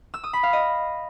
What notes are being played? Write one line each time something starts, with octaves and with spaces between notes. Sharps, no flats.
E6
D#6
B5
F5
D#5